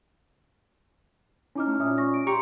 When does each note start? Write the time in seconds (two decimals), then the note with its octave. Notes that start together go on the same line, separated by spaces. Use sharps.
1.55 C#4 D#4 E4 D6 F6
1.67 A3
1.80 A#2 C#4 E5 D#6
1.98 C#6 A#6
2.14 D7
2.27 G4 A#5 C6 C#6 C#7